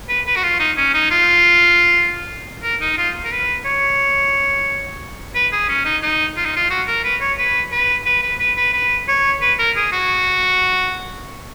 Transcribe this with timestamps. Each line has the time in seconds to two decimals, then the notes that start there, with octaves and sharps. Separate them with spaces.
0.09 B4
0.27 B4
0.36 F#4
0.43 F4
0.60 D#4
0.77 C#4
0.94 D#4
1.10 F4
2.63 A#4
2.81 D#4
2.98 F4
3.25 A#4
3.32 B4
3.65 C#5
5.35 B4
5.52 G#4
5.69 C#4
5.85 D#4
6.02 D#4
6.37 F4
6.46 D#4
6.56 F4
6.70 F#4
6.88 A#4
7.04 B4
7.21 C#5
7.38 B4
7.72 B4
8.06 B4
8.23 B4
8.40 B4
8.57 B4
8.73 B4
9.08 C#5
9.41 B4
9.59 A#4
9.76 G#4
9.92 F#4